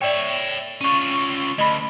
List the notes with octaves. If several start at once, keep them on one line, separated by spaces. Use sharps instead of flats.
C#5 D5 E5 G5
C#4 F4 C#6 D#7
D2 D#5 B5